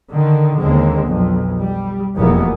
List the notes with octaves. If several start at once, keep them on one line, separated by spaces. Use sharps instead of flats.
D3 D#3
D#2 D3 G#3 C4
B1 F2
G3
F1 E2 B2 A#3 B3